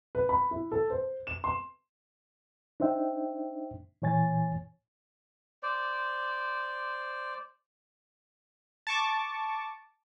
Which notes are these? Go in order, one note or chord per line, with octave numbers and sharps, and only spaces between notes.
B4
B5
E4
A4
C5
E7
C6
D4 D#4 C5 E5 G5
A#2 E3 C#5 G#5 A6
C5 D5
A5 C#6 D6